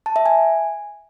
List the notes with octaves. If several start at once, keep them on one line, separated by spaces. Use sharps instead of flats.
A5
E5
G#5